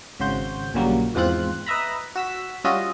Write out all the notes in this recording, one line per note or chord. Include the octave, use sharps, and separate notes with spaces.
G#1 C#3 F#4 C5 G6
A#1 A#2 C#3 F#3 G3 A#3
E2 G#2 F3 C4 F4 F#6
B4 D#5 E5 A#5 B5
F#4 E6 B6
G3 C#4 F4 F#4 D#5 E5